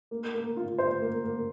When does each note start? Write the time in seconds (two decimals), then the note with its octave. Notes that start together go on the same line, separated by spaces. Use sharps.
0.11 A#3
0.34 A#3
0.57 F4
0.78 C5
1.01 A#3
1.24 A#3